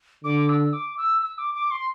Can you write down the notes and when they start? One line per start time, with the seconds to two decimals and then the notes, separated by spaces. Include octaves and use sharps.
0.24 D3 D6
0.49 E6
0.73 D6
0.98 E6
1.22 E6
1.38 D6
1.55 D6
1.71 C6